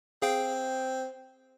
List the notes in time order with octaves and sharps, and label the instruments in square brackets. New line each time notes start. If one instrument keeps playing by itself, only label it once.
[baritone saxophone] C4 [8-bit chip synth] G#4 F5 G5